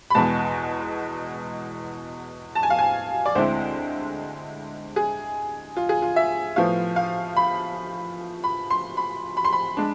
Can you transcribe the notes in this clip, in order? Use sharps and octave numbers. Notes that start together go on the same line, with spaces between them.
B5
E2 B2 G#3 A5
A5
G#5
F5
G#5
D5
D2 D3 G#3 C4 E4 C5
G#4
F4
G#4
F4
E5
A2 F3 B3 F5
F5
B5
B5
C6
B5
B5
C6
B5
G#3 D4